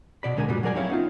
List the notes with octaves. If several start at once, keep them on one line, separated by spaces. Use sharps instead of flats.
B2 D5 B5
D2 D3 G#3 A#4 F#5 G#5
F#2 A#2 F#3 G3
F#3 G#4 A#4 D5 G#5
C4 C#4 E4 C#5 F5
B3 D#4 F4